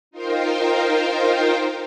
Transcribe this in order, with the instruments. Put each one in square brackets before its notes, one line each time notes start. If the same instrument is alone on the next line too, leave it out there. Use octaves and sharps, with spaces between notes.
[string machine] D#4 F4 A#4 C5 F5 G5